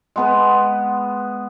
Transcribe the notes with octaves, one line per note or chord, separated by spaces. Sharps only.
G#3 B3 B4